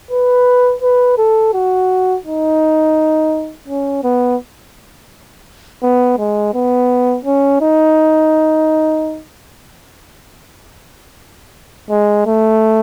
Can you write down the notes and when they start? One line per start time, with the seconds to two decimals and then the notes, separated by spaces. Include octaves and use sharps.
0.11 B4
0.82 B4
1.18 A4
1.53 F#4
2.25 D#4
3.68 C#4
4.04 B3
5.83 B3
6.18 G#3
6.54 B3
7.25 C#4
7.61 D#4
11.90 G#3
12.26 A3